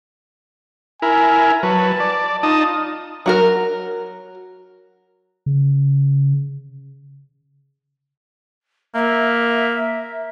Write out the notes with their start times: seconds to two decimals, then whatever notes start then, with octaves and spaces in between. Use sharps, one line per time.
1.02 E4 A#4 G#5
1.63 F#3 B4 A5
2.00 D5
2.43 D#4 F4 A5 D#6
3.26 F#3 F#4 A#4
5.46 C#3
8.95 A#3 E5